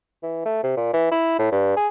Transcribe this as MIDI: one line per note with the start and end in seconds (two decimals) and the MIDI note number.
0.23 0.45 52
0.46 0.63 57
0.64 0.74 48
0.77 0.89 46
0.94 1.09 52
1.12 1.37 64
1.39 1.50 45
1.52 1.75 43
1.77 1.88 68